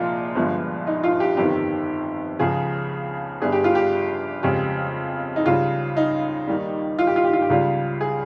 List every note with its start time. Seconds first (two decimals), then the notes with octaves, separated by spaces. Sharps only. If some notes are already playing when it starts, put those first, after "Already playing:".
Already playing: C2 A#2 F3 G#3 F4
0.35 G1 G2 F3 G#3
0.87 D#4
1.03 F4
1.20 G4
1.37 G1 F2 D#3 G4
2.39 C#2 C#3 F3 G#4
3.42 G1 G2 G3 G#4
3.52 G4
3.64 F4
3.75 G4
4.43 F2 C#3 G#3 G4
5.36 D#4
5.46 C#2 C#3 G3 F4
5.97 D#4
6.47 D#2 D#3 G3
6.99 F4
7.07 G4
7.16 F4
7.25 G4
7.33 F4
7.42 G4
7.50 C#2 C#3 G3 F4
8.01 G#4